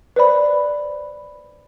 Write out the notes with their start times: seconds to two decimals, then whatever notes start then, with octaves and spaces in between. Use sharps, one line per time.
0.16 B4 C5 D5 B5